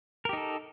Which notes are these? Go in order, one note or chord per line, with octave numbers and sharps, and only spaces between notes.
D#4 G4 A4 A#4